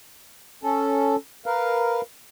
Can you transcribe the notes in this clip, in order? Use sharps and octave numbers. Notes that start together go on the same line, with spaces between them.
C#4 A4
A#4 B4 F5